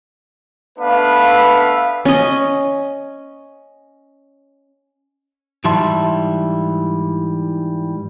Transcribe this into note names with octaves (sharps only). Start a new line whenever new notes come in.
A3 B3 D4 B4 E5 F5
C#4 D#5
G#2 E3 G3 E5 A5 C6